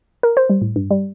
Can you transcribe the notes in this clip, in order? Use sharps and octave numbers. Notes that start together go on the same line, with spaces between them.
A#4
C5
G3
A2
G2
G3